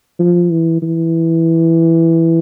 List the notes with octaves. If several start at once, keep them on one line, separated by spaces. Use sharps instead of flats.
F3
E3
E3